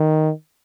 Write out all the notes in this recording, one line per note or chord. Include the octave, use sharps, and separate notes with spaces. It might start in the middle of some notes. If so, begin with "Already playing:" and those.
Already playing: D#3